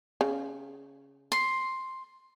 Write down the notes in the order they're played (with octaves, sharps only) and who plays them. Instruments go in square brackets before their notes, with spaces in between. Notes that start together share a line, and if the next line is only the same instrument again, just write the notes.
[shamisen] C#3
[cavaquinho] C6